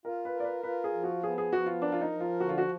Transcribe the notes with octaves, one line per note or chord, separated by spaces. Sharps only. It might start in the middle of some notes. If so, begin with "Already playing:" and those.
F4 A#4
B4
A#4
D5
B4
F4 B4
G#4
F3
F#4
B3 G#4
G#4
F3 F#4
F4
D4 A#4
F4
D#4
F3
F4
D3 F#4
F4
F#4